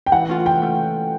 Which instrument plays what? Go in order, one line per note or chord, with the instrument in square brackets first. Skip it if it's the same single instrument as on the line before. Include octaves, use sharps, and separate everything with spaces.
[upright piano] G5
[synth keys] E3 [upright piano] F#5
[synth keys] A3 C#4 F4
[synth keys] E3 [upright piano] G5
[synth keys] A3 C#4